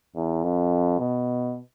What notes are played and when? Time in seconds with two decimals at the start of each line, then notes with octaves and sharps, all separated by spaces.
0.16 E2
0.43 F2
1.00 B2